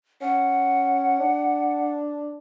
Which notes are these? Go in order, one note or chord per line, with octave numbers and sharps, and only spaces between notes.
C#4 F#5
D4